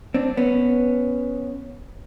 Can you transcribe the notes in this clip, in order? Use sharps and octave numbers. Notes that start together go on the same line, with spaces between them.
C4 D4
B3 C#4